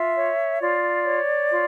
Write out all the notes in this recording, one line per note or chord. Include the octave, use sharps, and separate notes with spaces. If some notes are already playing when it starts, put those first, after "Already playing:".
Already playing: F4 E5
C#5
F4 D5
C#5
F4